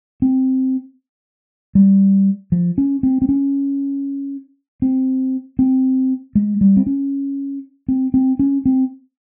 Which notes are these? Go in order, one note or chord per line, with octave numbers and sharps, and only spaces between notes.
C4
G3
F3
C#4
C4
C4
C#4
C4
C4
G#3
G3
C4
C#4
C4
C4
C#4
C4